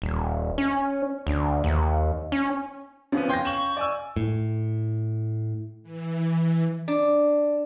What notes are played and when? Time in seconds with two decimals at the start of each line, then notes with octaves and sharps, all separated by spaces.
0.02 D#1
0.58 C#4
1.27 D2
1.64 D#2
2.32 C#4
3.12 G#1 F3 B3 C#4
3.29 F5 G5 G#5 C6 G6 A#6
3.45 C#6 E7 F#7
3.77 D5 G#5 E6
4.16 A2
5.83 E3
6.88 D4